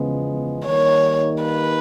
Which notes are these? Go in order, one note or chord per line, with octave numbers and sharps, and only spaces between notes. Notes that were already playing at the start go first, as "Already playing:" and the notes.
Already playing: E2 C#3 F3 G#3 B3
D#3 G3 A#3 D#4 C#5
B4